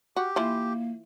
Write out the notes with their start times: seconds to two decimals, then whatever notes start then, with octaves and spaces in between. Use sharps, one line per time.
0.16 F#4 G4
0.36 E3 A#3 E4 F4